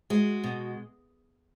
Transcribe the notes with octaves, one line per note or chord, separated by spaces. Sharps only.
G#3 F#4
B2